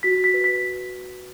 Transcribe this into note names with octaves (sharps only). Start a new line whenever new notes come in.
F#4 B6
B6
B4
B6